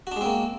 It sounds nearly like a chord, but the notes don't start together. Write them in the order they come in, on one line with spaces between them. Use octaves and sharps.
F#4 D4 G#3 C4 A#3